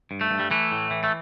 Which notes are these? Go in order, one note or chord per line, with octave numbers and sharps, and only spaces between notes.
G2
A3
G2
G3
E3 A3
A2
E3
A3